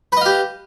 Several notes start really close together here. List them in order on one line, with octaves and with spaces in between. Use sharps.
B4 D#5 F5 G4